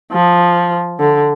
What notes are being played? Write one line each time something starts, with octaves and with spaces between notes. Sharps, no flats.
F3
D3